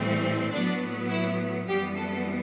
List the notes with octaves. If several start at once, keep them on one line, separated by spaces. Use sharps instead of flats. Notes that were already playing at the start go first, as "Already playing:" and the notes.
Already playing: A2 E3 G3 C4
A2 F#3 B3 D4
E4
F#2 E3 G3 B3 G4
A4